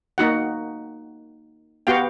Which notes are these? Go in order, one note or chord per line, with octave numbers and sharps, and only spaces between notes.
A#3 D#4 F#4 F#5
B3 F#4 G4 F5 G5